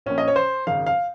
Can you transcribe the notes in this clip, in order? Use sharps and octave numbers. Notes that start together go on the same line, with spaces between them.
A#1 A#2 C#4
D#5
C#5
C5
G#1 F#2 C#3 F5
F5